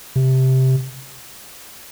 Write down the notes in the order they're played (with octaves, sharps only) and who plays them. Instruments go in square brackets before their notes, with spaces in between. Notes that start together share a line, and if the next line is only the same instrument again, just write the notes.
[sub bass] C3